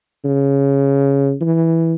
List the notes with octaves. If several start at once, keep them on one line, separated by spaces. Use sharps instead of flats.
C#3
E3